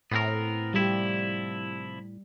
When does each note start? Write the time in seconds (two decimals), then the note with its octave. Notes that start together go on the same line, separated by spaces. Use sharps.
0.11 A2 B3 C4 A#4
0.74 C2 F3 G3 E4 G4